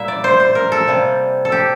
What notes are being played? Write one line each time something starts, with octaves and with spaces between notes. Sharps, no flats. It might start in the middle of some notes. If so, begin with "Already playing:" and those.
Already playing: A#2 G3 A#3 E4 E5
D5
C5
C5
A#4
A4
C3 G3 A#3
A4
G4